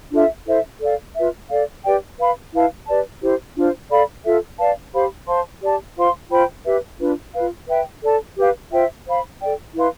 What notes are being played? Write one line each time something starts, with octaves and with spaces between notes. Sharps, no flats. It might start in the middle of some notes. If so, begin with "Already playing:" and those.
D4 F4 A4 E5
E4 A4 C5 E5
A4 D5 F5
F4 B4 E5
A4 D5 F5
G4 B4 D5 G5
B4 F5 B5
E4 B4 F5 A5
G4 B4 D5 A5
E4 G4 C5
D4 F4 C5
A4 D5 F5 B5
F4 A4 E5
B4 D5 F5 A5
G4 C5 F5 B5
C5 F5 A5 C6
G4 D5 A5
F4 C5 F5 C6
F4 C5 G5 B5
G4 B4 E5
D4 F4 B4
F4 B4 F5
B4 E5 G5
A4 D5 A5
G4 B4 F5
F4 C5 E5 G5
C5 F5 B5
A4 D5 G5
E4 B4 F5 C6